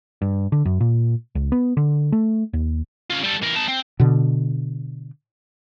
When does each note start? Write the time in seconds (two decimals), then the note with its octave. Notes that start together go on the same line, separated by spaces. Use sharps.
0.22 G2
0.52 D3
0.65 F#2
0.80 A#2
1.35 C#2
1.52 B3
1.77 D3
2.12 A3
2.53 D#2
3.10 C#4 F4
3.23 G3 A4
3.42 E3 A#4
3.55 D#4 A5
3.68 C4
4.00 B2 D3